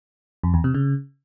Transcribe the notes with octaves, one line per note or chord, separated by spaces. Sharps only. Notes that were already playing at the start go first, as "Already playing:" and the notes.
F2
E2
C3
C#3